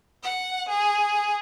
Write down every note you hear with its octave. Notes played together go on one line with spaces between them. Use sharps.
F#5
G#4